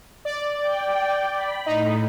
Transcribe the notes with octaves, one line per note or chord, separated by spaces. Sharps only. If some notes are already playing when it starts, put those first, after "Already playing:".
D5
G5
B5
A2 D#4